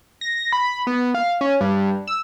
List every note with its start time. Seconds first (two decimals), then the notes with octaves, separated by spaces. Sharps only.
0.21 A#6
0.53 B5
0.87 B3
1.15 F5
1.41 C#4
1.61 G2
2.07 E6